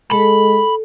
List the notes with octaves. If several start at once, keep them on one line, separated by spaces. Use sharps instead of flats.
G#3 A4 B5